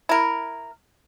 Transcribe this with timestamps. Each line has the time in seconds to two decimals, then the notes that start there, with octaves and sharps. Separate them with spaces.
0.09 E4 A#4